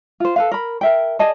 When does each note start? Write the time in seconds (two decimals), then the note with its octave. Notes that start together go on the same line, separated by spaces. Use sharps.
0.20 F4 C5
0.36 A4 B4 F5
0.51 A#4 B5
0.81 A#4 E5 G5
1.19 G#4 D5 D#5 A5